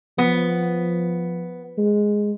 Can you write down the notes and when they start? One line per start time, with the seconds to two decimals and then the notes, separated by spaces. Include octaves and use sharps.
0.18 F3 B3
1.78 G#3